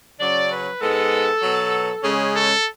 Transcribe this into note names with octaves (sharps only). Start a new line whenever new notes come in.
C#3 F#3 C#4 D5
B4
G#2 G#3 B3 A4
B2 F#3 B3
C#3 G#3 C#4 G#4
A4